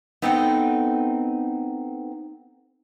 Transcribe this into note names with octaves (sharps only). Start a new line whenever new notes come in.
B3 C4 D#4 A4 F#5 G5